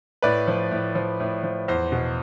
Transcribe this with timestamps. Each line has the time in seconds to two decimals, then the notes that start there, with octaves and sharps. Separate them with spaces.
0.22 A2 B4 D5
0.47 F3
0.71 A2
0.95 F3
1.20 A2
1.44 F3
1.68 E2 C5
1.92 B2